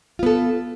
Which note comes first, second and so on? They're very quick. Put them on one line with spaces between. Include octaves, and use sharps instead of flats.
F4 B3 A4